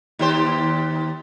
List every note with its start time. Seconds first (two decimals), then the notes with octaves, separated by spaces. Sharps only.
0.19 D#2 G4 C5